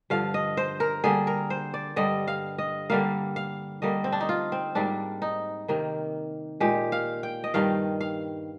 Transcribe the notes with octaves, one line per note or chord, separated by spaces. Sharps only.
G2 D3 F3 F5
D#5
C5
A#4
D3 G3 A#3 G#4
A#4
C5
D5
G2 D3 G3 D#5
F5
D#5
D3 G3 A#3 F5
F5
D3 G3 A#3 D#5
C4
D4
D#4
F4
C4
G#2 G3 A#3 D4
D#4
C3 D#3 A#3
A#2 G#3 G4
F5
G5
D#5
G2 D#3 G3 F5
F5